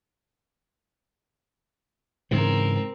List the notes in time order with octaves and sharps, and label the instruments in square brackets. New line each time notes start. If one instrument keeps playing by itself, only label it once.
[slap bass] G#2 C#3 E3 [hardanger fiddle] C4 A#4